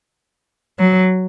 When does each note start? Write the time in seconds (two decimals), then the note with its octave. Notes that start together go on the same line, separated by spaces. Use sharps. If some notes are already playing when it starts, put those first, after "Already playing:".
0.79 F#3